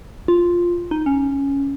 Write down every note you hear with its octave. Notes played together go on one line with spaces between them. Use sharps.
F4
D#4
C#4